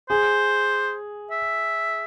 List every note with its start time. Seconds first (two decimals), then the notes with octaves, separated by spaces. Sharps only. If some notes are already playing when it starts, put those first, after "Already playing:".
0.09 G#4 C5
1.31 E5